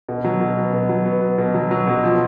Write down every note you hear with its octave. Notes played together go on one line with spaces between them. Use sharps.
B2
F#3
B2
B3
B2
F#3
B3
B3
B2
F#3
F#3
B2
F3